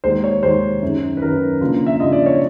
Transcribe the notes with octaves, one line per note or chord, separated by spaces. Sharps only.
D#2 D#3 G#3 C5
C#5
D#2 D#3 G#3 C5
F#2 D#3 F#3
B4
F#2 D#3 F#3 A#4
C#3 F3 A#3 D4 F4
E5
C#3 F3 A#3 D4 F4 D#5
D5
C#5